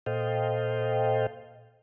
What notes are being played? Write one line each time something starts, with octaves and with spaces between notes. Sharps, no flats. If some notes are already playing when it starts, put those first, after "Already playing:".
A#2 A4 C5 D#5 F5 G5